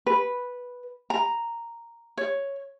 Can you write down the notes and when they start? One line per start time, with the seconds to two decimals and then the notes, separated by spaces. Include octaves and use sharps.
0.06 B4
1.10 A#5
2.17 C#5